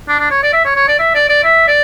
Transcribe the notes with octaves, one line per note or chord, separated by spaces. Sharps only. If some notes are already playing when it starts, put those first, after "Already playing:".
D4
D4
C#5
D5
E5
C#5
C#5
D5
E5
D5
D5
E5
D5